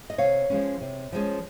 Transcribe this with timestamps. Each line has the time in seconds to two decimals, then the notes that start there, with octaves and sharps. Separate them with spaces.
0.10 D#5
0.18 C3 C#5 F5
0.50 F3 G#3 C#4
0.81 C3
1.12 F3 G#3 C#4